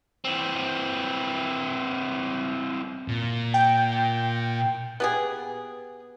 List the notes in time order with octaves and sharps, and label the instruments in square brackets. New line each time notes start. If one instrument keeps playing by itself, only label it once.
[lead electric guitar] E3 C4
[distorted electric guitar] A#2
[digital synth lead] G5
[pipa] B3 G4 G#4